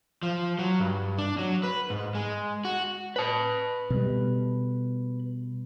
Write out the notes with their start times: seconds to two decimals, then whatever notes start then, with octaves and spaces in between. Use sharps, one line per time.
0.23 F3
0.59 F#3
0.80 G2
1.18 D4
1.39 F#3
1.63 B4
1.90 G#2
2.15 G#3
2.65 F#4
3.16 B4 A5
3.90 B2 G3